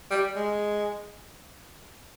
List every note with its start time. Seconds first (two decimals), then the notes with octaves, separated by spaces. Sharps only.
0.11 G3
0.36 G#3